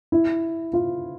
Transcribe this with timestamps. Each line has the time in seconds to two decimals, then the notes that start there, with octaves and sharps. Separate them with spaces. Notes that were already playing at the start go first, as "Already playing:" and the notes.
0.12 E4
0.73 F4